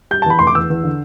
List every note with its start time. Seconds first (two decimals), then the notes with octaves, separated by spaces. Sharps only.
0.11 G3 G6
0.22 A5
0.26 E2 B5
0.39 F1 C6
0.47 D6
0.55 E2 E6
0.70 E2
0.84 D3